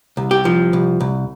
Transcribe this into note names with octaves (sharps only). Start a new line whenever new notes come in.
C2
G4
F3
C2
C2